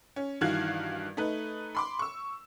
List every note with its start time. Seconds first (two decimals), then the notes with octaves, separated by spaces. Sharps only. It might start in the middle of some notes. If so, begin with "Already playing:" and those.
0.16 C#4
0.41 G2 D#3 E3 F#4 F5 G#6
1.17 A3 D#4 B4
1.75 B5 C6 D6
1.99 C#6 E6